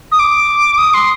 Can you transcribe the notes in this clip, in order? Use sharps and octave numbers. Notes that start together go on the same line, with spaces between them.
D#6
D6
D#6
C6